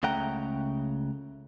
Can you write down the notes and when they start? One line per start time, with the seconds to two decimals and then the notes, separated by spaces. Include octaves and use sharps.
0.03 C#2 C#3 A3 F#5 G5 A#5